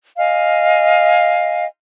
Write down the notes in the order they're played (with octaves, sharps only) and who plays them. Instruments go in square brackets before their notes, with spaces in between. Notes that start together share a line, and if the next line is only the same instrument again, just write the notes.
[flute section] D#5 F5 G#5